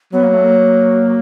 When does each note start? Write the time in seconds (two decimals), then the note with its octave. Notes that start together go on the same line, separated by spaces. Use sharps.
0.13 F#3 B3
0.23 A#3
0.34 A3
0.44 A#3